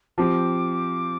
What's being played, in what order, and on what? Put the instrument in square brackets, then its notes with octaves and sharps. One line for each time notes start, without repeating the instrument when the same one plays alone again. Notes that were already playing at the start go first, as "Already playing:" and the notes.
[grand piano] F3 C4 G4 [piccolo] D6